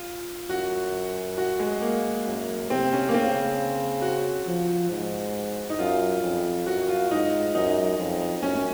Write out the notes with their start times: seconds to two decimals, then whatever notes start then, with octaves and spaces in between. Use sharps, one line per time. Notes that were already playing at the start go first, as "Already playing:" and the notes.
Already playing: F4
0.49 F#2 F#4
1.37 F#4
1.59 G#3
1.81 A#3
2.26 F#2
2.70 C3 C4
2.92 C#4
3.09 A#3
3.14 C#3 C4
4.02 F#4
4.46 F3
4.90 G#2
5.70 D#4
5.78 F#2 F4
6.22 F2
6.66 F#2 F#4
6.88 F4
7.11 G#2 D#4
7.55 F#2 D#4
7.98 F2
8.42 F#2 C#4
8.56 C#4